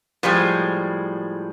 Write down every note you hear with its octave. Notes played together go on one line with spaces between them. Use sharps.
A2 F3 G3 G#3